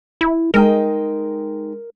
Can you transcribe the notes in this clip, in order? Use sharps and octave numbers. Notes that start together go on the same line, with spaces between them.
E4
G#3 D#4 A#4 G5